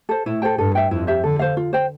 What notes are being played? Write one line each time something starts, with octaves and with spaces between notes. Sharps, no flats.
A4 C5
A2 E4
A4 C5 G5
G2 A4
E5 G5
F2 E4
G4 C5 E5
D3 A4
C5 F5
F4
C5 G5